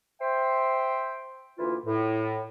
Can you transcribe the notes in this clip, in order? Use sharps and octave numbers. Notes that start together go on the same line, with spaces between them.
C5 E5 G5 C6
D2 E3 A#3 E4 F4
A2